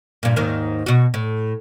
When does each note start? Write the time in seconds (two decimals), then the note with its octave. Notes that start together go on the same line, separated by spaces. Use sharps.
0.23 G2 A#2
0.36 D#2 G#2 D#3
0.86 B2 F#4
1.14 A2